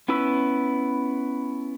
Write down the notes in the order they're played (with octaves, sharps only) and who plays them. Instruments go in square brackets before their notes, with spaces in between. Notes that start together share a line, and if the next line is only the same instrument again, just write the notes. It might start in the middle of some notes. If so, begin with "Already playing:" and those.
[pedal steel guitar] B3 C#4 E4 B4 E6